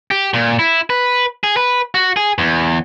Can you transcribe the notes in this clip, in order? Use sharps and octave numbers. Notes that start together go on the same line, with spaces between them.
G4
A#2
E4
B4
G#4
B4
F#4
G#4
E2